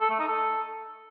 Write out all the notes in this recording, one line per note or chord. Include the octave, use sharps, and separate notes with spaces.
A4
A3
D#4
A4